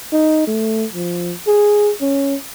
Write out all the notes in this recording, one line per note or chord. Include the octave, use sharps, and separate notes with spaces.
D#4
A3
F3
G#4
C#4